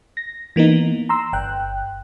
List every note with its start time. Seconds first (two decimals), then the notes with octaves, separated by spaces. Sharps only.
0.17 A#6
0.56 E3 A#3 B3 D#4
1.09 A#5 C6 E6
1.33 G1 G5 F#6